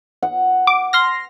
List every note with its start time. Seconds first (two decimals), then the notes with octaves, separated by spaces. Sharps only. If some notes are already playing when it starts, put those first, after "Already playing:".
0.23 F#5
0.67 D6
0.93 C6 F6 A#6